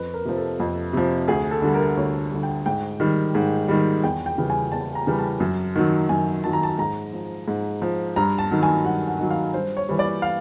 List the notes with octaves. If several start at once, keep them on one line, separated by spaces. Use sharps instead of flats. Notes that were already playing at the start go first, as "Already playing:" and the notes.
Already playing: F2 B4
A#4
C3 F3
A4
F2
C3 F3
D2 G#4
A4
D3 G3
A#4
D2 C#5
D3 G3
G5
G#2 G5
D#3 G3
G#2
D#3 G3
E2 G5
G5
C#3 E3 G3
G#5
E2 A5
A#5
C#3 E3 G3
A5
F#2
D#3 F#3
F#2 G#5
D#3 F#3 A5
A#5
A5
G#2 A#5
F3
G#2
F3
G2 A#5
A5
D#3 F#3
G#5
G2 F#5
F#5
D#3 F#3
F5
G2 C5
C#5
E3 G3
D5
F5